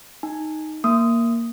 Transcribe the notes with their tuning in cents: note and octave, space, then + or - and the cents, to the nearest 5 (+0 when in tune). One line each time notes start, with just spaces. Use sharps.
D#4 +0 G#5 +0
A#3 +0 D#6 +5